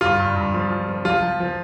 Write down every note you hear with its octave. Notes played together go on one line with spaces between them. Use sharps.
G2 F4
G2
G2
F3
F3
F3
F3 F4
F3
F3